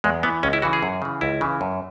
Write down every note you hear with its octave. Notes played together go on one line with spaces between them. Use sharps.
E2 G#3
E3 B3
C#2 C#4
E4
C#3 E3 F#4
G#4
F#2
C#3 E3
C#2 E4
C#3 E3
F#2